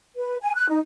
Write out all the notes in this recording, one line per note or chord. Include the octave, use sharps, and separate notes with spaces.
B4
G#5
F#6
D#4